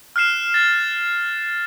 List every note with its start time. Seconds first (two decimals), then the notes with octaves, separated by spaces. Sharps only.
0.16 F6 F#6 C7 E7
0.54 A6